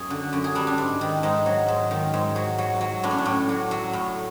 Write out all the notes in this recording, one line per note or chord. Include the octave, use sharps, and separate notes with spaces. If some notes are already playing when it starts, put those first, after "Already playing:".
Already playing: F#2 G#4
D3
F#2
G#4
G3 D4
D4
G#2
D#3
G#2 D#4
F#3
G#2
D#3
G#2
F#3
F#3
F#3
A2 D4
C#4
D4
A2
F#3
F#3
A2